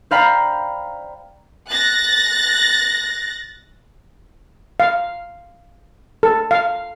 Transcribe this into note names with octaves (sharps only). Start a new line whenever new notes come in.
C5 D5 F5 G5 A#5 B5
F#6 A6 A#6
F5
A4
F5